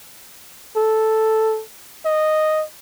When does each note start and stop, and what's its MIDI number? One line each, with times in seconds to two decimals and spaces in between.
0.76 1.62 69
2.05 2.64 75